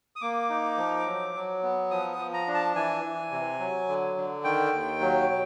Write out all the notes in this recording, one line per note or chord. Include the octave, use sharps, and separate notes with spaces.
D#6
A#3 D6
D#4
F3
F#3
F#3
B3
F3 D#6
D#6
F3
A#5
D4
A5
E3 G#5
E3
C3
F#3
D3
D3
D#3 G5
D#2
F#3
B2